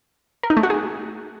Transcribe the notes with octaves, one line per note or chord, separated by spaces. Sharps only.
A#4
D#4
A3
F#4
G#4